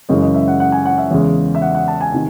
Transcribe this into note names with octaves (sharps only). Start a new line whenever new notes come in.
F#2 C#3 E3 G#3 D#5
D#5
E5
F#5
F#5
G#5
F#5
E5
E2 C#3 G#3
E5
F#5
F#5
A5
G#5
C3 D#3